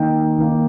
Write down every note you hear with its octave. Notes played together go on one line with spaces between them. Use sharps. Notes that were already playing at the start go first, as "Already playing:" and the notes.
Already playing: D#3 A#3 D#4 G5
D#3 A#3 D#4